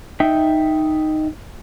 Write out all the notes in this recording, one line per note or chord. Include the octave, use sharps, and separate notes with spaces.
D#4 E5 G5